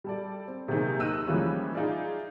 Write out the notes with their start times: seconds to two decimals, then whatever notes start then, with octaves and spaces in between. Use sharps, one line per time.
0.04 G3 A4 D5
0.48 C4
0.68 C3 D#3 F#3 A#3 D#4 G#4
0.99 D#2 D#4 D#5 E6 F#6 D#7
1.27 E3 F3 G3 G#3 A#3 C#4
1.73 D#4 F4 G#4 D5 E5